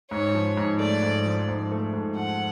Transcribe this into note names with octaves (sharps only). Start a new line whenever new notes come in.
G#2 C#5
F3
G#2
A3 D5
G#2
F3
G#2
A3
G#2
F3 F#5